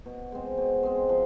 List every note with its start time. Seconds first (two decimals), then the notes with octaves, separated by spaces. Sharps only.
0.06 B2
0.32 G#3 C4
0.58 B2
0.83 G#3 C4
1.09 F3